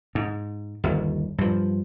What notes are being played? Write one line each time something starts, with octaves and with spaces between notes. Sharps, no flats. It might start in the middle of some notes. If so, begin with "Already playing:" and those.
G#2
G1 D#2
G2 F3